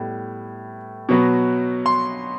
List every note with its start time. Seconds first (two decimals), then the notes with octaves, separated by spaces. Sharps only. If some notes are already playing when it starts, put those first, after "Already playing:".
Already playing: A2 G3 B3
1.09 B2 F#3 B3
1.86 C6